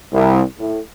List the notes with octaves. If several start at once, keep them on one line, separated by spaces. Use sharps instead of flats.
C2
A2